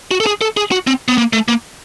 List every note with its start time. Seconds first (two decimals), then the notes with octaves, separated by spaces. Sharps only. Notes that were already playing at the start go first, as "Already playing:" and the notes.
0.11 F#4
0.20 A4
0.26 G#4
0.41 A4
0.57 G#4
0.72 F#4
0.87 C4
1.08 B3
1.18 A#3
1.33 A3
1.48 A#3